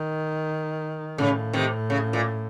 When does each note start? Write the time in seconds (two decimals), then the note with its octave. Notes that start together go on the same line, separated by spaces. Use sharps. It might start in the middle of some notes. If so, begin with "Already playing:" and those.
Already playing: D#3
1.18 A2 C#3
1.53 C3 D#3
1.90 C#3
2.13 A#2